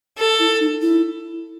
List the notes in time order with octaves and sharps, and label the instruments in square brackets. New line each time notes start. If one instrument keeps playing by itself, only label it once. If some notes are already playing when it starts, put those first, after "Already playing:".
[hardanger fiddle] A4
[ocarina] E4
D#4
E4